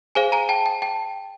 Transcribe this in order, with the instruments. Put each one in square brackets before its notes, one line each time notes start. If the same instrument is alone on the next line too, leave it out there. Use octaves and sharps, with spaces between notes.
[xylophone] G#4 C5 F5 G#5
G#5 A#5
G5 A5
G5
G5 A5